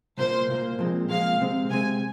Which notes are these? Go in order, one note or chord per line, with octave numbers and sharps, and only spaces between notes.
C2 A#2 A#3 C5
C2 A#2 A#3
A#2 F3 G#3 C4
A#2 F3 G#3 C4 F5
C3 G#3 C4
C3 G#3 C4 G#5